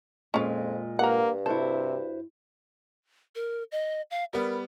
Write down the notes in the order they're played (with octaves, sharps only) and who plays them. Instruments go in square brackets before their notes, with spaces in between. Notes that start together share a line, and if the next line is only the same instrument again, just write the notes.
[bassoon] F2 [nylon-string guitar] A#2 G#3 [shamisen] C#4 F4
[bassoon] G2 [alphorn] A#3 [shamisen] A#4 F#5
[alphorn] C3 [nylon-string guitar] E4 F#4 C5 [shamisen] A4
[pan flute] A#4
D#5
F5
[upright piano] G3 B3 [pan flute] A#4